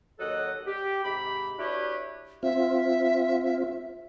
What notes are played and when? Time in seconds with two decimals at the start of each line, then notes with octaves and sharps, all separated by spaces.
0.19 D#2 F#3 A4 D#5 F#5
0.66 G4
1.04 G#2 C3 G4 B5
1.58 D4 E4 F#4 G4 B4 C#5
2.43 C4 F4 E5